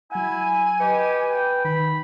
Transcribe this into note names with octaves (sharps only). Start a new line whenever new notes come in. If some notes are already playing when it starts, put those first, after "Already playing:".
F#3 E4 F#5 G#5
G4 B4 D#5 G#6 C#7
G5
D#3 B5